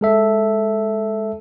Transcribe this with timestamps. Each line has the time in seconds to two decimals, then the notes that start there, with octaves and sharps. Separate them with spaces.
0.01 G#3 A4 E5